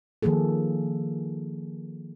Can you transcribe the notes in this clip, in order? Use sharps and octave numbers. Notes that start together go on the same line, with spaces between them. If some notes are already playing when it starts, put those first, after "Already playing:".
D#3 F3 A#3 G#4 A4